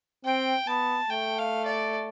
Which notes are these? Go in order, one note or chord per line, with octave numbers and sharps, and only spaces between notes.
C4 G5
B3 A5
A3 G5
F5
D5